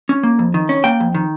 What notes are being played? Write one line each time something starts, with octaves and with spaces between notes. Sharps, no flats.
C#4
A#3
F2
D#3
C#4
A#3 G5
F2
D#3